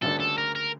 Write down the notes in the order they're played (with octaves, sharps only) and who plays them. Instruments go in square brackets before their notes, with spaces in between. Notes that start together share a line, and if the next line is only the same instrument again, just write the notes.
[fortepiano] D2 C#3 G3 A#3 D4 [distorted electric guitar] A4
[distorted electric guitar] A4
A#4
A#4